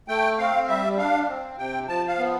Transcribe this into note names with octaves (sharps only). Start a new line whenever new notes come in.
A3 G5
C4 F5
G3 E5
D4 F5
C4
C3 G5
F3 A5
F5
B3